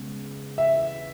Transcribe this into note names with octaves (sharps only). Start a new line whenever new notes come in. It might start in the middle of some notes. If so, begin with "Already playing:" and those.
Already playing: C#3 G#3 B3
E5